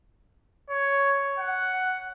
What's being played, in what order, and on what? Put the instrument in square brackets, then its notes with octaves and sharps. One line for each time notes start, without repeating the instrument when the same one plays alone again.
[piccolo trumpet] C#5
F#5